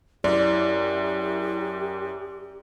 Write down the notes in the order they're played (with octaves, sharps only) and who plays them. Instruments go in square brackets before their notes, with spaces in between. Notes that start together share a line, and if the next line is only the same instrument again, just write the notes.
[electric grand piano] F#2 [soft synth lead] E4 [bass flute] G4 [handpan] D5